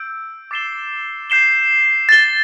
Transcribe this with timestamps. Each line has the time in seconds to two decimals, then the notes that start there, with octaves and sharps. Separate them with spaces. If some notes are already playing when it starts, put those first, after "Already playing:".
Already playing: E6 G6 D7
0.51 D6 A6 C7 E7 G7
1.30 G6 C7 E7 G7
2.09 A6 C7 G7